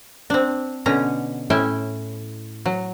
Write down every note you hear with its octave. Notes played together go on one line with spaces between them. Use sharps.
C4 D4
B2 D3 C#4 A#5
A2 C#4 E4 E5 G5
F#3